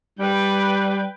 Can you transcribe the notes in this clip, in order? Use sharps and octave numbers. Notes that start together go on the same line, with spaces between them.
G3 B4 G5